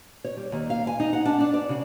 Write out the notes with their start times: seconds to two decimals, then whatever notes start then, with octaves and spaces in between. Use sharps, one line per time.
0.24 C#5
0.37 G3
0.52 D#2
0.70 F5
0.87 G#5
1.00 D#4
1.13 F#5
1.25 D4
1.41 D4
1.54 D5
1.69 C#3